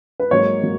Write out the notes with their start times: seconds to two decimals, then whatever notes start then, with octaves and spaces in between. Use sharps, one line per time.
0.20 B4
0.31 G#2 F#3 A#3 C#5
0.63 F#3 A#3